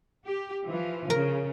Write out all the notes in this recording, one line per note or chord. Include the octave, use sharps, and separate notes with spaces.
G4
E3 F3
C#3 A#4